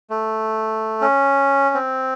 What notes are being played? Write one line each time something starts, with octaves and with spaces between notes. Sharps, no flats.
A3
C#4
C4